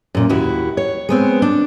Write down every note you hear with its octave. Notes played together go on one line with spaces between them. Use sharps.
F#2 A#2
D#2 E4 F#4
C#5
G#3 B3 C4
D4